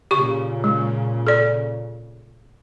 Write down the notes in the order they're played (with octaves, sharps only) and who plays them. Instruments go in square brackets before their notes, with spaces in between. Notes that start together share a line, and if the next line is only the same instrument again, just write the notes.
[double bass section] A#2 C#3 [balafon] G4 C#6
[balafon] G#3
A4 D5